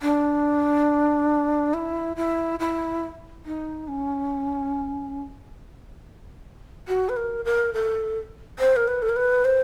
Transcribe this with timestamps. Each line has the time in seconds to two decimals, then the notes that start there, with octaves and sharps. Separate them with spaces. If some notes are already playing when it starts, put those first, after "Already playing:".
0.02 D4
1.74 E4
2.17 E4
2.60 E4
3.46 D#4
3.88 C#4
6.88 F#4
7.09 B4
7.17 A#4
7.45 A#4
7.73 A4
8.59 C5
8.76 A#4
8.88 B4
9.02 A4
9.09 A#4
9.16 B4
9.45 C5